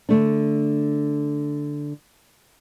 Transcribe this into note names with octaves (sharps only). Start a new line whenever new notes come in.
D3 A3 D4